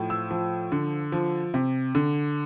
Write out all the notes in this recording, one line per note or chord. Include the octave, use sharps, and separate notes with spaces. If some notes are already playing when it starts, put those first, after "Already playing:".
Already playing: A2 F3
E6
F3
D3
F3
C3
D3